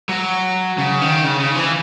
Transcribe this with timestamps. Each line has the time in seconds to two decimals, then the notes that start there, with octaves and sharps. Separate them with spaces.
0.09 F#3
0.78 C#3
1.01 D#3
1.24 C#3
1.40 C#3
1.55 E3